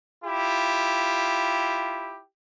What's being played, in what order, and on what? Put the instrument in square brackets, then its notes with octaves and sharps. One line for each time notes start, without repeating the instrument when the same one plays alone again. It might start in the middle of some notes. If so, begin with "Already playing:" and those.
[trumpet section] E4 F4 G4